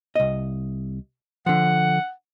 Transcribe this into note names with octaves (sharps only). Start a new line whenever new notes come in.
C2 D#5
D3 F3 F#5